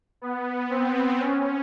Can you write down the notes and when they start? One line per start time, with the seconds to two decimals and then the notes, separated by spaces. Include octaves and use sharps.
0.22 B3
0.70 C4
1.20 C#4